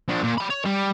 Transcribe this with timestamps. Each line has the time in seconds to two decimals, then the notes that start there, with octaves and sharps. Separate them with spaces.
0.09 F3 D4
0.24 A#2
0.38 G5 B5
0.50 C#5
0.65 G3